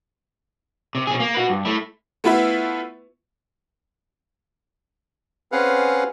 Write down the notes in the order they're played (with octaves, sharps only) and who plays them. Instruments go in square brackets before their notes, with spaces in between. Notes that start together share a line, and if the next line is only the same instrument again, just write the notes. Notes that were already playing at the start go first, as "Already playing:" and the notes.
[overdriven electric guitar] C3
B2 G#4
A#3
F#4 B4
G2
A3 E4
[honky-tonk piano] A3 B3 E4 F4 B4 E5
[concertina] C4 C#4 G#4 B4 F5 F#5